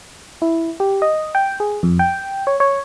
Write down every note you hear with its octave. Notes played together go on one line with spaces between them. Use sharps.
E4
G4
D#5
G5
G#4
F2
G5
C#5
C#5